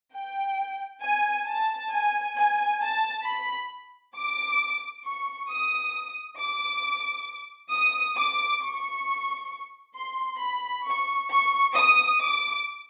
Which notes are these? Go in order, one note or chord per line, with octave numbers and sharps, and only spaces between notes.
G5
G#5
A5
G#5
G#5
A5
B5
D6
C#6
D#6
D6
D#6
D6
C#6
C6
B5
C#6
C#6
D#6
D6